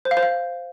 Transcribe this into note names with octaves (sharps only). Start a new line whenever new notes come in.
C5
F5
C5
F5